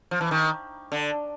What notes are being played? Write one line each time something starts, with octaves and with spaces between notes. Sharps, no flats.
F3
E3
D#3
D3